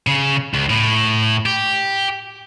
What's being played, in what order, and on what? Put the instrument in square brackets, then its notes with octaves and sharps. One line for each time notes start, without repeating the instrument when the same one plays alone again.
[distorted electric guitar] C#3
C#2
A2
G4